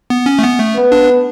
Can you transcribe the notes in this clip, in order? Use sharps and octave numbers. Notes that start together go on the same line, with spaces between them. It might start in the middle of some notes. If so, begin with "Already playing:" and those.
B3
C#4
A3
B3
A3
B3
D4